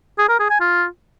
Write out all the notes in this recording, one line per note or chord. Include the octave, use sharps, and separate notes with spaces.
G#4
A#4
G#4
G#5
F4